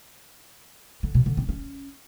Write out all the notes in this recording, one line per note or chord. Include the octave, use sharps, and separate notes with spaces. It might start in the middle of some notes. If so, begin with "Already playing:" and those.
D3
B2
D3
C4
C#4